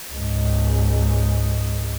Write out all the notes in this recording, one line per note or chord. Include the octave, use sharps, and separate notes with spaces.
C#2 G#2